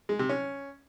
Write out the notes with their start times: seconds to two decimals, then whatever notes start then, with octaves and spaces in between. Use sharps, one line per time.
0.09 G#3
0.19 C3
0.29 C#4